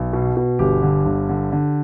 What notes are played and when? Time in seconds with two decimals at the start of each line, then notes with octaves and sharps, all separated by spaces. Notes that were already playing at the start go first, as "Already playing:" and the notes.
Already playing: B1
0.13 B2
0.37 B2
0.59 G1 G4
0.83 D3
1.06 G1
1.29 D3
1.52 D3